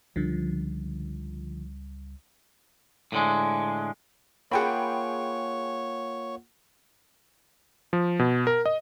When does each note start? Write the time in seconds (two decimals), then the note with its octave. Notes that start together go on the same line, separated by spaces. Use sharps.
0.16 C#2 D3 F3 G3
3.12 A2 D3 G#3
4.51 A#3 F4 G#4 C#5 F#5 G5 B5
7.93 F3
8.19 B2
8.47 A#4
8.66 D#5